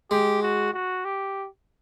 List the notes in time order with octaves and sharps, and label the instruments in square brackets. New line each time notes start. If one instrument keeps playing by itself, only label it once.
[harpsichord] G#3 [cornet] G4
[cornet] F#4
F#4
G4